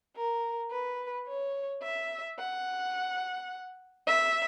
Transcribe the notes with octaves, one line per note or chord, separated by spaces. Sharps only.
A#4
B4
C#5
E5
F#5
E5